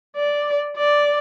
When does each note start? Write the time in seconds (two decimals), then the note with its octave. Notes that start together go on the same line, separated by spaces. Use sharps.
0.16 D5
0.77 D5